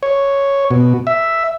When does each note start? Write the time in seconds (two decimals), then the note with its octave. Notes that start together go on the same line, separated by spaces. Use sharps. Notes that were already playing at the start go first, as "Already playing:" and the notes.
0.03 C#5
0.71 B2
1.07 E5